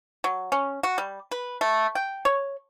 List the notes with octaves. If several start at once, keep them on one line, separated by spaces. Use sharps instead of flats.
F#3
C#4
F#4
G3
B4
A3
G5
C#5